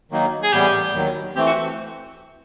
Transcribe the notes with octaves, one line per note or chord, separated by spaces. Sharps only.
D#3 F#3 A#3 D#4
G#4
A2 E3 G3 B3 G4
D#2 D#3 F#3
E3 A3 C4 G4
F#4